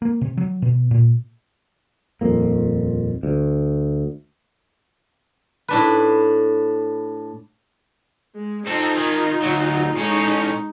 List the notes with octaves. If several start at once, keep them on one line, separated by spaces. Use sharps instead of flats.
A#3
C3
F#3
B2
A#2
D#1 F2 A#3
D2
A2 D4 B4
G#3
C4 D#4 F4 A4
D#3 G#4
D2 F#3
A2 G#3 C#4 D#4